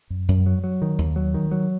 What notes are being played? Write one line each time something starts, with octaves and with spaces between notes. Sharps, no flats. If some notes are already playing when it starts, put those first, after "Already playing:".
F#2
F#2
F#3
F#3
D#3
D#2
F#3
D#3
F#3